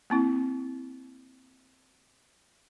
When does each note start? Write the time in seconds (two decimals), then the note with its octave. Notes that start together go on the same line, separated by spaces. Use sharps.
0.10 A#3 C4 E4